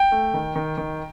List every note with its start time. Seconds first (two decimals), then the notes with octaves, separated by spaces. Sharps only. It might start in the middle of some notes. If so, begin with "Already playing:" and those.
Already playing: G5
0.12 A3
0.34 D#3
0.56 D#3
0.78 D#3